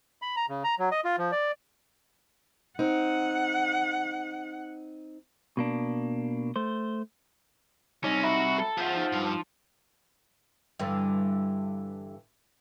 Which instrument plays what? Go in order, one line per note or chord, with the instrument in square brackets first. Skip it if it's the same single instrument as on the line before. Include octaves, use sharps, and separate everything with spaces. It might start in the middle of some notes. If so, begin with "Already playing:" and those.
[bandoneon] B5
A#5
C#3
A#5
F#3
D#5
F4
F3
D5
[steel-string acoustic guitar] C4 D#4 [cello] F#5
[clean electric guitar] B2 A#3 D4
A3 C5
[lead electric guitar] G3 C4 [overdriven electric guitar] C#4 [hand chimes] D#4 D#5 A#6
[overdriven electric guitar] F#4 [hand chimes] E5 A#5 B5
[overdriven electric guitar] A4
[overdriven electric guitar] F3 [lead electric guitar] G#4 E5 [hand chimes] F#5 G6 B6
[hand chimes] D#4
[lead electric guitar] G2
[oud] G2 D3 E3